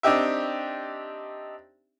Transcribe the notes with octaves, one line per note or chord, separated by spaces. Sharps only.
C4 D4 D#4 G4 E5